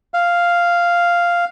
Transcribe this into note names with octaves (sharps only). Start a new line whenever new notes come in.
F5